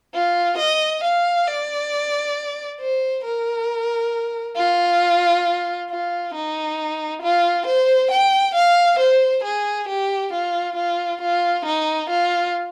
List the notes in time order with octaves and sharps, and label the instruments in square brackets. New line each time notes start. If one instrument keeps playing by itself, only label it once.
[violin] F4
D#5
F5
D5
C5
A#4
F4
F4
D#4
F4
C5
G5
F5
C5
G#4
G4
F4
F4
F4
D#4
F4